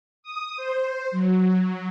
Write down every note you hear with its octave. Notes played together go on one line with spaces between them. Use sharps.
D#6
C5
F#3